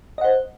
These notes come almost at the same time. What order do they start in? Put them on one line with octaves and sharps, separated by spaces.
D#5 F#5 C5